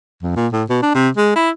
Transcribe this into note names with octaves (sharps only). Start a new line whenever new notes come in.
F2
A#2
A2
B2
D4
C3
G#3
E4